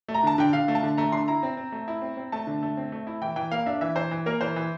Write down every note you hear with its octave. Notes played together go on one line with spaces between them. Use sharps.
A3
A#5
D3 A5
D3 G5
D3 F5
A3
A5
D3
A3 A#5
D3 C6
E4 A#5
C4
C4
A3
E4
C4
C4
A3 A5
D3
A3
C4
A3
E4
E3 G5
E3 G5
A#3 F5
D4 E5
E3 E5
E3 C5
E3
A#3 A#4
E3 C5
E3